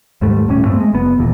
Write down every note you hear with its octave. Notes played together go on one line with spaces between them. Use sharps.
D#2 G#2 G3 A3
D#1 A2 G3 C#4
G2 A3 B3 C4
G#3
F#1 B3
D#1 E2 A#2